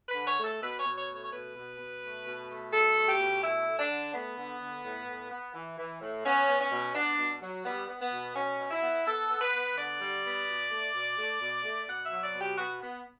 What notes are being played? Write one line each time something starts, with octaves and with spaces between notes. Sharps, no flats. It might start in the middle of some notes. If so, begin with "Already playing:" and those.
B4
D3
C#5
A3
A4
B2 B4
C#5
B2
C#5
A3
C#5
C#5
B2 B4
B2
B2
A3
B2
A3
B2 A4
A3
G4
B2
A3 E4
A3
D4
D3
A3 B3
D3
D3
A2
A2
B3
E3
E3
A2
B3 C#4
B3
C#4
B2
B3 D4
B2
F#3
G3 B3
B3
B3
B2
B2 C#4
B2
E4
B3
B3 A4
B3
B4
B3
D3 D5
G3
B3
B2
A3
B2
A3
B2
A3
B2 F#5
E5
F#3
D5
B2
G4
B3 F#4
B3